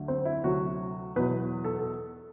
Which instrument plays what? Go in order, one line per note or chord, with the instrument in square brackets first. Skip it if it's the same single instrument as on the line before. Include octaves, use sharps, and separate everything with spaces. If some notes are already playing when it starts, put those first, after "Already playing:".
Already playing: [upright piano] D2 D3 F#3 A3
C4
E4
D2 C3 F#3 F#4
E2 B2 F#3 B4
A4
A4